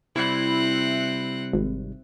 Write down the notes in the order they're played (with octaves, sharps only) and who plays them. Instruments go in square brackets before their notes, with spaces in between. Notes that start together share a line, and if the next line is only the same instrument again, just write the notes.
[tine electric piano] C3 G3 [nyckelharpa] C4 F#5 [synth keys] E4
[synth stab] G#1